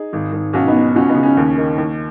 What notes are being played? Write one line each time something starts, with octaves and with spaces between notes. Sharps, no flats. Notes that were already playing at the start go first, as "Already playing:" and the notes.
Already playing: D#4 G#4
G#1
G#1
B1 C#4 F#4
B3 D#4
B2
C#2 C#4 F#4
B3 D#4
C#3
C#4
D#2
D#3
D#2